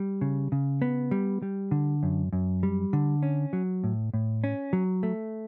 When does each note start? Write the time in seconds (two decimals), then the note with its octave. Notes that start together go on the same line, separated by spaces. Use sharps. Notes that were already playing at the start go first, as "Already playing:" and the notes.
Already playing: G3
0.21 C#3
0.52 C#3
0.82 B3
1.11 G3
1.42 G3
1.71 D3
2.03 F#2
2.33 F#2
2.63 G3
2.93 D3
3.23 C#4
3.53 F#3
3.84 A2
4.14 A2
4.44 C#4
4.73 F#3
5.03 A3